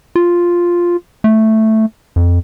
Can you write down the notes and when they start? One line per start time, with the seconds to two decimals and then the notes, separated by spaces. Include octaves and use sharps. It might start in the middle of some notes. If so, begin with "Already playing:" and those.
0.16 F4
1.24 A3
2.16 F2